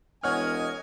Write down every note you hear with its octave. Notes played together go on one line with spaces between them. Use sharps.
E1 C#5 D#5 F#5 G#5 F6